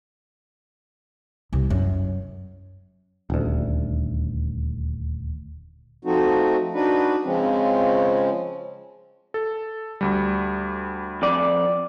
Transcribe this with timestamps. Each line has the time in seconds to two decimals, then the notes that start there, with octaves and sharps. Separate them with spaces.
1.53 C2
1.70 F#2
3.30 D#1 D2
6.05 F3 A3 C4 D#4 F#4
6.74 D4 D#4 F#4 B4
7.25 C#3 F3 G#3 C4 C#4
9.34 A4
10.01 D2 G3
11.22 F2 D5